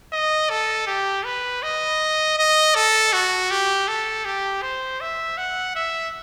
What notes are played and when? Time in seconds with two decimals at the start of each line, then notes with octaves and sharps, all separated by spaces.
0.13 D#5
0.50 A4
0.87 G4
1.25 B4
1.63 D#5
2.38 D#5
2.75 A4
3.13 F#4
3.51 G4
3.88 A4
4.25 G4
4.62 C5
5.01 E5
5.37 F#5
5.75 E5